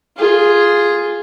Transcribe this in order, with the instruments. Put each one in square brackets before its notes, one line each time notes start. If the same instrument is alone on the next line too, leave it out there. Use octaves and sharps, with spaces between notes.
[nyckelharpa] F4 G#4